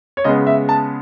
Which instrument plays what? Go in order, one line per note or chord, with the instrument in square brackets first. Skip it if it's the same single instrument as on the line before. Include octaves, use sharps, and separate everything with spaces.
[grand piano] C#5
C#3 G#3 B3 D#5
E5
A5